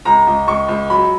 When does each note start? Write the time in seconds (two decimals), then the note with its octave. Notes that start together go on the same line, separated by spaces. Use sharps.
0.05 C#2 A#5
0.27 C#2
0.48 C#2 C#6
0.68 C#2
0.90 F#3 B5